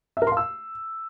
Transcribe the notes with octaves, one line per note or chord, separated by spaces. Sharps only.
E5
A#4
C6
F5
E6